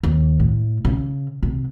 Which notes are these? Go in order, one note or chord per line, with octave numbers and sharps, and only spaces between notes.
D#2
A2
C#3
C3